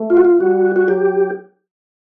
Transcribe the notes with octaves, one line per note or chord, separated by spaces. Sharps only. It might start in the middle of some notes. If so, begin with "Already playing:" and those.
Already playing: A3
F4
F#4
F4
G3 F#4
F#4
F#3 G4